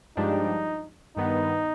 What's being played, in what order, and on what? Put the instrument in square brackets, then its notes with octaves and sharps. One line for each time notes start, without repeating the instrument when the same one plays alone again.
[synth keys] G2 F3 G#3 D4 G4 [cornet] D#4
[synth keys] G2 D#3 B3 [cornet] D#4